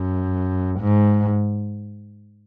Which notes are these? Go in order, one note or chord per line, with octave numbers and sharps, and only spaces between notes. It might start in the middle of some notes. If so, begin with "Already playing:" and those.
Already playing: F#2
G#2